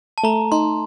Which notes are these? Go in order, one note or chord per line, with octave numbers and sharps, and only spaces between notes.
A5
A3 A#5
D#4 C6